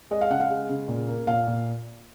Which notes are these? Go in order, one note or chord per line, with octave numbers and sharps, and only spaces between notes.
G#3 D#5
F5
C#3 F#5
F5
G#3
C#3
A#2
A#3
A#2 F5
A#2